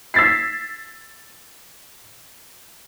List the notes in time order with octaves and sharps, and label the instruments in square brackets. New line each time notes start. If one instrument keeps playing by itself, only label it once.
[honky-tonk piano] E6 G#6 A6 B6 C7